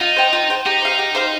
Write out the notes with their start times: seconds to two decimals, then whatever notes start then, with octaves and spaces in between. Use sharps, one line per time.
0.01 D#4 F4
0.16 C5 G5
0.33 F4
0.50 C5 G5
0.66 D#4 G4
0.82 C5 F5
0.99 G4
1.15 C5 F5